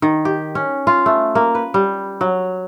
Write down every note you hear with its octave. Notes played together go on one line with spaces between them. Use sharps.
D#3
G4
C#4
F4
A3
A#3
B4
G3
F#3